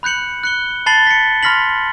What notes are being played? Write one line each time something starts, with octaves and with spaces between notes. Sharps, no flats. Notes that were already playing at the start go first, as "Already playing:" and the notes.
B5 F#6 G6 C#7 F#7
F#6 C#7 G7
A5 B5 A6 C7 F#7 G7
B6 C#7
B5 C6 F6 A#6 B6 F#7